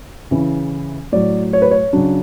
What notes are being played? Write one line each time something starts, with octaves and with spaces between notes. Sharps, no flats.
C#3 E3
A2 F#3 D5
C#5
B4
C#5
C#3 F#3 D4